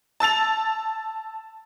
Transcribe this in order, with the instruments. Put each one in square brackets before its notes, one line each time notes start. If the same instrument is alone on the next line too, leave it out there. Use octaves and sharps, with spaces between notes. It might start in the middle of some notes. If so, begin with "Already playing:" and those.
[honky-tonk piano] A5 E6 A6 F7